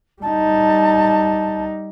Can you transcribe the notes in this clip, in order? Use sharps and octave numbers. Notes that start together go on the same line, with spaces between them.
G3 D#4 A5